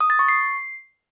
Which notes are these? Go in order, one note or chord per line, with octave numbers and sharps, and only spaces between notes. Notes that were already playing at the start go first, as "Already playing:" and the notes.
D#6
A6
C#6
C7